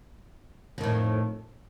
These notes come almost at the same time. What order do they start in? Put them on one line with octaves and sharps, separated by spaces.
F2 D#3 A2